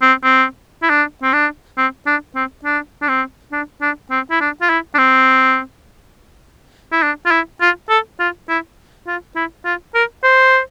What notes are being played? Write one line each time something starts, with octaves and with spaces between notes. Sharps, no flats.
C4
C4
E4
D4
C4
D4
C4
D4
C4
D4
D4
C4
D4
D4
C4
E4
D4
F4
E4
D4
C4
E4
D4
F4
E4
F4
A4
F4
E4
F4
E4
F4
A#4
C5